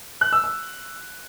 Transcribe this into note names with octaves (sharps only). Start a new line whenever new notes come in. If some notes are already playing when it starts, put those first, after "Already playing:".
F#6
E6
E6